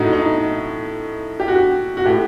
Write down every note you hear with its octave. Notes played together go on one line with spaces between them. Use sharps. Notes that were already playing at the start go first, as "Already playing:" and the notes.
Already playing: A2 D#4 F#4
D#4
G4
F#4
F#4
A2 G4